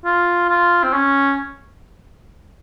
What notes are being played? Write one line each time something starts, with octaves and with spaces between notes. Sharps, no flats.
F4
F4
C4
C#4